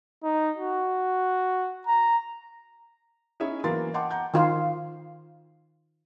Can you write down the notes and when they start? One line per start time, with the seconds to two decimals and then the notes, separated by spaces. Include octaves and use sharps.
0.23 D#4
0.57 F#4
1.87 A#5
3.40 C#4 D#4 E4 G#4 C#5 E5
3.64 E3 F#3 A#3 C6 A6
3.94 D#5 F#5 G5 A5 C6 D6
4.11 F#5 A#5 G6
4.34 D#3 F4